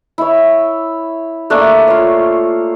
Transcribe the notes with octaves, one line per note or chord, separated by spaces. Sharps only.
E4 C#5
A3 A#3 D4
F4 C#5